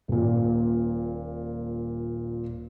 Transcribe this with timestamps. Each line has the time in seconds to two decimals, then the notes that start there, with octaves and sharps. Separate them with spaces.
0.08 D#1 A#2